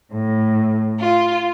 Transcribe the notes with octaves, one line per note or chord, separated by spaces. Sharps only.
A2
F4